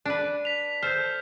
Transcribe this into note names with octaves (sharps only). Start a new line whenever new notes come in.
D4 B4
B6 F7
A4 C5 F6 G6